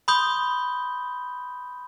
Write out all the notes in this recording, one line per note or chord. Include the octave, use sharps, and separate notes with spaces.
B5 C6 D#6 G6 G7